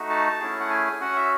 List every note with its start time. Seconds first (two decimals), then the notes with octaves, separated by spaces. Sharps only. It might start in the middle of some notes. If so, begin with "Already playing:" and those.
Already playing: A3 D#4 F#4
0.10 A5
0.41 A3 C#4 E4 G#4
0.60 F#5
0.70 G#5
1.01 C#4 F#4 F#5
1.16 E5